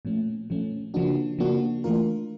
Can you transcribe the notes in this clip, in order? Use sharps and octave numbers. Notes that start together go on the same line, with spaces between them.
A#2 F3 A3 C#4
A#2 F3 A3 C#4
C#3 F3 A#3 D4 F#4
C#3 F3 A#3 D4 F#4
E3 A3 D4 F4 A#4